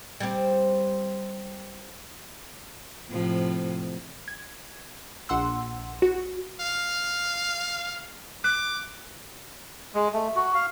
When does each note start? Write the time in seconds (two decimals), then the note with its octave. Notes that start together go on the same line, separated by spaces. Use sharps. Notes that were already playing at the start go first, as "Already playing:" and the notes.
0.20 G3 C4
3.09 A2 C3 F3
4.28 G#6
5.29 A#1 F#5 C6 E6
6.02 F#4
6.61 F5
8.44 D6 F#6
9.95 G#3
10.14 A3
10.36 F#4
10.55 F5